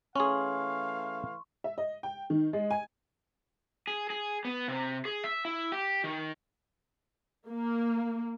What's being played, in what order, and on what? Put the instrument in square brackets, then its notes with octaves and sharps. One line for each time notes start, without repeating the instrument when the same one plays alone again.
[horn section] E3 A3 F5 [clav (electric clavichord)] C#4 G#4 [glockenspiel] C6 C#6
[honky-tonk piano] E5
D#5
G5
D#3
G#3
G#5
[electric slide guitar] G#4
G#4
B3
C3
G#4
E5
E4
G4
D#3
[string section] A#3